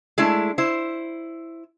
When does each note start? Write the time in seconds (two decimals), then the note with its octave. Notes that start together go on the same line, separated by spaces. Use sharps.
0.18 G#3 A3 D4 E4
0.58 E4 C5